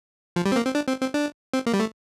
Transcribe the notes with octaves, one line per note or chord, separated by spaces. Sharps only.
F3
G3
C4
A#3
C4
D4
C4
C4
D4
C4
A#3
G3
A3